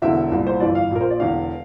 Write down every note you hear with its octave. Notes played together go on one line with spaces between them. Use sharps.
E1 E2 D3 E5
C2 A#2
C5
G1 F2 E3 D5
F5
A#1 A#2 A#4
C5
D5
E1 E2 D3 F5